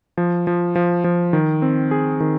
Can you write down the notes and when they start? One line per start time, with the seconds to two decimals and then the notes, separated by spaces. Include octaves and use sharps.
0.17 F3
0.47 F3
0.76 F3
1.04 F3
1.33 D#3
1.62 C4
1.91 G#4
2.20 D#3